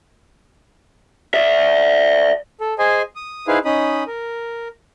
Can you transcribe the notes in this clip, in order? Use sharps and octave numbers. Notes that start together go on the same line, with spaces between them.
D5 E5
A4
G#4 C5 D#5 G#5
D#6
D#4 E4 G#4 B4 C5 F5
C#4 D#4 D#5 B5 D#6
A#4